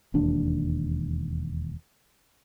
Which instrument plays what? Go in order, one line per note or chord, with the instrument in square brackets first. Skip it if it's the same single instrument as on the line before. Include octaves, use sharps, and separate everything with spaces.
[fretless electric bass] E1 D#2 D4